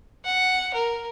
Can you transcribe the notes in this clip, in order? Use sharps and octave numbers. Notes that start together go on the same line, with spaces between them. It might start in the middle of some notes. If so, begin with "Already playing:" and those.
F#5
A#4